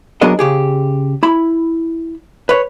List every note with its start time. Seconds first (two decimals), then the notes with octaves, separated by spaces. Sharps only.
0.21 F#3 B3 D4 G#4 A#4 D#5
0.39 C#3 G4 G#4
1.23 E4 B5
2.49 B4 C#5